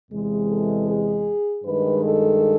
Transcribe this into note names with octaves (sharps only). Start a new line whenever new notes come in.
E2 C3 E3 G#3
A4
G#4
G2 D#3 G#3 B4
A4